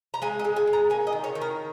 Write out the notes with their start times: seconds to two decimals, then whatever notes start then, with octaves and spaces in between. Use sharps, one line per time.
0.14 A#5
0.22 G#3 G#5
0.39 D#5
0.45 G#3
0.56 G#5
0.67 G#3
0.73 A#5
0.90 A#3 G#5
1.07 D#5
1.13 D#3
1.24 C#5
1.35 D#3
1.41 A#4